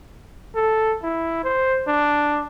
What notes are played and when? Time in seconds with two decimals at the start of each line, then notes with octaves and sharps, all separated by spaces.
0.55 A4
1.03 E4
1.44 C5
1.87 D4